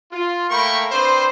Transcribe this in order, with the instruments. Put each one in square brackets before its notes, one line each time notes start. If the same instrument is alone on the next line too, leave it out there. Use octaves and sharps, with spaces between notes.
[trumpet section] F4
A3 A#3 A#4 G5 B5 C#6
C4 D4 B4 C5